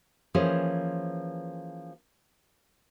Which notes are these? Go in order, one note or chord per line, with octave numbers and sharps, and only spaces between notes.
E3 F3 A#3 C#4 G#4 C5